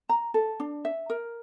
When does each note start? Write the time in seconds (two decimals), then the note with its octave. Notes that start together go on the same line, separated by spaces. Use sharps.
0.09 A#5
0.34 A4
0.60 D4
0.85 E5
1.10 A#4